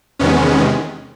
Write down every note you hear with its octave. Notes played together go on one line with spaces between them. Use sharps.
E2 C3 D#3 G#3 B3 C#4